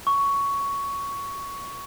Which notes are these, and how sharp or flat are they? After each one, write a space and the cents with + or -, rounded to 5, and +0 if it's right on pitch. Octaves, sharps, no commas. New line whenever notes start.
C#6 +10